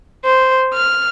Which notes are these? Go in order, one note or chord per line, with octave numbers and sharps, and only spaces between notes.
C5
F6